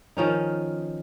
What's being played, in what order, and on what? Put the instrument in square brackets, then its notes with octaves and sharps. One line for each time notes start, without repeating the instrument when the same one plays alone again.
[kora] D#3 F3 C#4 D#4